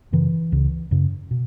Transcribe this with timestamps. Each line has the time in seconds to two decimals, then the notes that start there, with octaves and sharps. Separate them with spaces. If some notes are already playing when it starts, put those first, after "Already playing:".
0.12 F#2 C#3 E3
0.52 C#2 C#3
0.91 F#2 C#3
1.31 B2